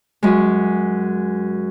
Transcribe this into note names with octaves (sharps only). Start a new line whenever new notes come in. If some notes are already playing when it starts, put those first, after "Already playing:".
F#2 G#3